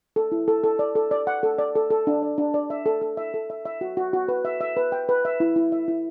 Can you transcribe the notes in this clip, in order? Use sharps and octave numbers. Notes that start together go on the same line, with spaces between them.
A4
E4
A4
A4
D5
A4
D5
F#5
A4
D5
A4
A4
D4
D5
D4
D5
E5
A4
A4
E5
A4
E5
E5
F#4
F#4
F#4
B4
E5
E5
B4
G5
B4
E5
E4
E4
E5
E4